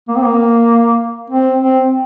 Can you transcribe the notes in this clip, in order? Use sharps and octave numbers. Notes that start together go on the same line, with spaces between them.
A#3
C4
A#3
C4
C4